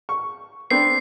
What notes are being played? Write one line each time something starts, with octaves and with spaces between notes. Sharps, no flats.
C#6
B3 C4 D4 C7